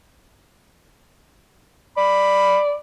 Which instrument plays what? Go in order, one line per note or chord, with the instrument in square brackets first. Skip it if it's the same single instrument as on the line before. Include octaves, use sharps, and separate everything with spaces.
[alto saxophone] D5 [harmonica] B5